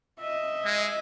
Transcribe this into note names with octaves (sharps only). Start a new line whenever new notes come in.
D#5 E5
G#3